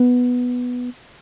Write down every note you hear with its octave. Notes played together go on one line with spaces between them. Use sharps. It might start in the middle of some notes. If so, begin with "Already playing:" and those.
Already playing: B3